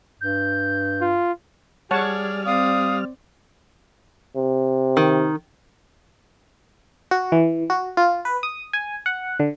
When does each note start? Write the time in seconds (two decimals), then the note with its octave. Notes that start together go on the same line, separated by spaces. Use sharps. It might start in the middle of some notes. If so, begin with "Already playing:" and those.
0.21 G2 G6
1.01 F4
1.91 G3 G#4 C#5 D5 F#5 A5 F6
2.44 C4 D5 F5 D#6
4.36 C3
4.97 D#3
7.11 F#4
7.32 E3
7.70 F#4
7.97 F4
8.25 B4
8.43 D#6
8.73 G#5
9.06 F#5
9.40 D3